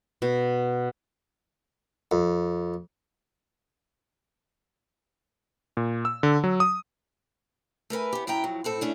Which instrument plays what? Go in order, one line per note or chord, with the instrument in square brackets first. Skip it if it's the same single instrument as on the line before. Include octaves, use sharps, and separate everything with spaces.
[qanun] B2
[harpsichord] F2
[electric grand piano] A#2
E6
D3
F#3
D#6
[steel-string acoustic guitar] A3 A#4 B4 G#5
B3 G4
F#2 E4 B4 G5 A#5
F2 A2 F#3
A2 C4 A4
A3 C#4 D4